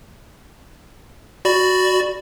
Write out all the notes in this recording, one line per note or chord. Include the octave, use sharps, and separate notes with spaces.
F#4 D5 B5